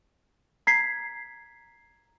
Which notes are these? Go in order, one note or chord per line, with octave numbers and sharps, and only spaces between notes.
A#5 G#6 B6 C7